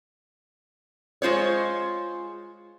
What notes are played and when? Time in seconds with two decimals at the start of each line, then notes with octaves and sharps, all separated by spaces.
1.22 G#3 F4 C5 C#5